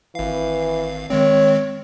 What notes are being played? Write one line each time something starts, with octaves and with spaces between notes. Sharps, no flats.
G#1 E3 F5
D#3 G#3 C4 C#5